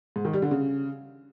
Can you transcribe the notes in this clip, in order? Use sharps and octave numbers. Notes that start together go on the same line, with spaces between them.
G#2
D#3
G3
D3
C#3